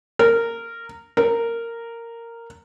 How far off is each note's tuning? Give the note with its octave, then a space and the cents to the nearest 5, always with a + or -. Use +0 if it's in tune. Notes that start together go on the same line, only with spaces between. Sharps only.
A#4 -15
A#4 -10